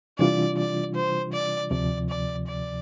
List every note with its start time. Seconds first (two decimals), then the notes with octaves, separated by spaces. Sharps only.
0.18 C3 E3 G3 D4 F4 D5
0.57 D5
0.95 C5
1.33 D5
1.71 D2 C3 F3 D5
2.09 D5
2.48 D5